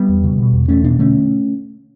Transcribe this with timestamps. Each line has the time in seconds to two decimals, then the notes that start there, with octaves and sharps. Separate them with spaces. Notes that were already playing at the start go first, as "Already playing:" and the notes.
Already playing: G3 B3
0.09 E2
0.24 C#3
0.39 B2
0.53 E2
0.68 E2 A3 C#4
0.84 B2 B3 D4
0.99 D3 A3 C#4